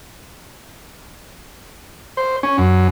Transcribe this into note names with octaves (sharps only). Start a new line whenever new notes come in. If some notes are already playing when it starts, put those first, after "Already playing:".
C5
C#4
F#2